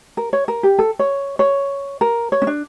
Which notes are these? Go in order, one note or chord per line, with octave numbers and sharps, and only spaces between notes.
A#4
C#5
A#4
G4
A4
C#5
C#5
A#4
C#5
C#4
D4